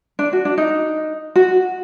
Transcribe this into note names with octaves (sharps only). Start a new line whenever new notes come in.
D4
F#4
D4
D#4
F#4